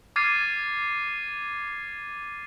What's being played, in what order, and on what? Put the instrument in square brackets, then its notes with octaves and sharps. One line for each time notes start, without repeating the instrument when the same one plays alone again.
[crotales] D6 F6 G#6 A6 C7 D#7